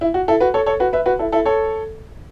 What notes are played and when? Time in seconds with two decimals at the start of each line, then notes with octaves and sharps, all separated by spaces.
0.01 E4
0.14 F#4
0.28 E4 A4
0.40 F#4 B4
0.54 A4 C#5
0.66 A4 C#5
0.80 F#4 B4
0.93 B4 E5
1.06 F#4 B4
1.19 E4 A4
1.32 E4 A4
1.45 A4 C#5